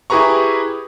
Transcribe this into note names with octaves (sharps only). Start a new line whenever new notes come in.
E4 G4 G#4 B4 A#5 C#6